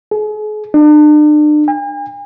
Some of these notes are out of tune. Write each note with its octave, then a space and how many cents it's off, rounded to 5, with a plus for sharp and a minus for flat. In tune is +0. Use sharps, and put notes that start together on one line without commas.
G#4 +40
D4 +40
G#5 -45